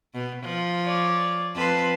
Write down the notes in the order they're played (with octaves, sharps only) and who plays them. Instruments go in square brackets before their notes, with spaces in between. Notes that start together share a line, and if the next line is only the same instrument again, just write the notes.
[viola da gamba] B2
F3
[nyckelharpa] C#5 D5
[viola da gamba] F2 B4 [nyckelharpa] A5 C6